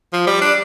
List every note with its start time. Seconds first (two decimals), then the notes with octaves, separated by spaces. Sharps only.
0.13 F3
0.27 G3
0.41 D4